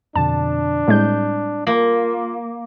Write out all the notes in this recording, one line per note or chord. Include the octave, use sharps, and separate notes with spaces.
F2 B2 D3 D4 A5
A2 G3 G#3 C4 G6
A#3 F4